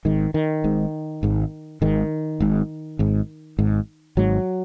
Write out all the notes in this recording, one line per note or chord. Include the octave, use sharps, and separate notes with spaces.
G#1 G#2 D#3
D#3
G#1 G#2
G#1 G#2
G#1 G#2 D#3
G#1 G#2
G#1 G#2
G#1 G#2
G#1 G#2 F#3